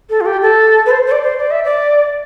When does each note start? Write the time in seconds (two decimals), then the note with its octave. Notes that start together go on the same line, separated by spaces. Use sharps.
0.10 A4
0.21 F4
0.26 G4
0.42 A4
0.86 B4
0.91 C5
1.06 C5
1.12 D5
1.23 C5
1.39 D5
1.51 E5
1.64 D5